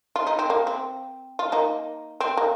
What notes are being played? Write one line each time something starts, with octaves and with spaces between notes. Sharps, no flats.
F4
D#4
C4
A#3
C4
F4
A#3 D#4
C4
A#3